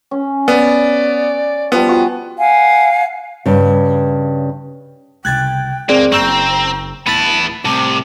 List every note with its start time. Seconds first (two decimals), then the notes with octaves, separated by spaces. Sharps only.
0.11 C#4
0.48 B3 D5
1.72 F3 G3 B3
1.88 F4 F#4 G#5
2.39 F5 F#5 G#5
3.46 G2 C#3
5.25 C2 C#3 G5 F#6 G#6 A6
5.89 C#2 A#3 C4 G#4 D5
6.12 F#1 C4 A#5 C#6 E6 G6
7.07 D1 B3 E4 A5 B5 A6
7.65 C2 A2 C3 A5 D6